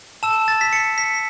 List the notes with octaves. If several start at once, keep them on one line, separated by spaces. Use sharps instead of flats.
A5 E6 E7
A6
B6
C#7
B6